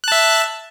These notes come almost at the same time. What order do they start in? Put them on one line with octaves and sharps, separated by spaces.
F#6 A5 E5